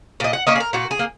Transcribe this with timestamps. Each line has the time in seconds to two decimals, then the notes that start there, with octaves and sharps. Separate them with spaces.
0.20 A#2 D#5
0.33 F#5
0.47 A#3 C#4 D#5
0.55 G#4
0.60 A#4
0.73 A#2 F#4
0.91 G#4
0.99 A#3